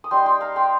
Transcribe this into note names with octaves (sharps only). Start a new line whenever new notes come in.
D#6
G3 D#4 G5 C6
G5 C6
F5 A#5
G5 C6